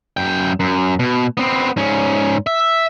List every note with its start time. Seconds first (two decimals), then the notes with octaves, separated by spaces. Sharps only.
0.17 F#2 G5
0.60 F#2
1.00 B2
1.37 B3 C4
1.77 G#2 C#4
2.47 E5